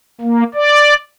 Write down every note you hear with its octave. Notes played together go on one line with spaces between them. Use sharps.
A#3
D5